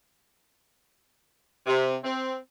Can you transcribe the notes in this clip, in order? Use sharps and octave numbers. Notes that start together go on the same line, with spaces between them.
C3
C4